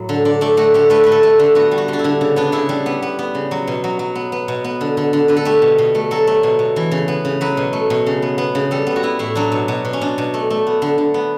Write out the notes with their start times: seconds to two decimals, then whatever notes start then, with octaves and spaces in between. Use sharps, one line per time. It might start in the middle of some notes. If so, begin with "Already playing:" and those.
Already playing: A2 F#3
0.09 D3
0.25 D3 D5
0.41 A3 D5
0.57 A3 F#4
0.74 D3 G4
0.90 A3 B4
1.04 A3 B4
1.12 A4
1.23 A3
1.39 D3
1.55 B3 F#4
1.71 G3
1.78 F#4
1.88 D3
1.93 D4
1.99 E4
2.04 D3
2.21 C#3
2.36 B3 D4
2.52 C#3 E4
2.69 G3 D4
2.86 B3
3.02 B3
3.19 B3
3.35 C#3
3.51 F#3
3.67 B2
3.84 F#3
3.99 F#3
4.15 B3
4.32 B3
4.48 B2
4.64 B3
4.81 D3
4.97 D3
5.13 D3
5.28 D3 B4
5.37 A4
5.45 A3 G4
5.62 B2
5.78 B2
5.95 A3
6.11 F#3 A4
6.27 A3
6.43 B2
6.59 B2
6.76 E3
6.91 C#3
7.08 B3
7.25 C#3
7.41 F#3 B4
7.57 B2
7.73 A3
7.90 B2
8.06 C#3
8.22 B3
8.38 B3
8.55 C#3
8.71 G3 A4
8.87 B3
8.96 F#4
9.03 B3 E4
9.19 A2 E4
9.35 F#3 D4
9.52 B2
9.68 B2
9.85 B2
9.93 C#4
10.01 B2 D4
10.18 B2
10.34 A3
10.50 A3
10.67 B3
10.82 D3
10.98 D3
11.14 B3